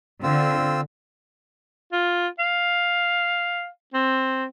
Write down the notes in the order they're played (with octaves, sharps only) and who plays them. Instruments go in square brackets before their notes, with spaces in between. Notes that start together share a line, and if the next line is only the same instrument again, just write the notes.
[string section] D3 [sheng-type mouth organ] C4 F4 E6
[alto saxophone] F4
F5
C4